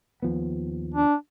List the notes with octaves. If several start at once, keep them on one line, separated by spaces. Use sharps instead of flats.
D#2 F3 B3
D4